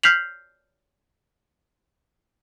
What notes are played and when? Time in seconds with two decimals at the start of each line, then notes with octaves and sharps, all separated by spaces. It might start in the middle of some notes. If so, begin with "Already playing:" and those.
0.03 F6 G6 B6 C7 F7 F#7